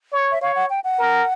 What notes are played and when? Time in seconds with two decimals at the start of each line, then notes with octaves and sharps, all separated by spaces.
0.12 C#5
0.32 E5
0.41 C#5 F5
0.56 F#5
0.70 G5
0.84 F#5
0.99 A#4